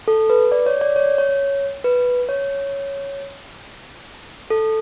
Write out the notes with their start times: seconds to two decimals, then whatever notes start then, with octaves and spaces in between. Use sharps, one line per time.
0.08 A4
0.30 B4
0.52 D5
0.66 C#5
0.81 D5
0.96 C#5
1.18 C#5
1.84 B4
2.29 C#5
4.50 A4